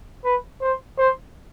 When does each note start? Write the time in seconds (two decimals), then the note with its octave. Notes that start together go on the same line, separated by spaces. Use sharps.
0.24 B4
0.61 C5
0.98 C5